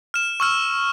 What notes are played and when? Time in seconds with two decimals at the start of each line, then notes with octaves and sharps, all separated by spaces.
0.14 F6 E7
0.40 C#6 E6 F6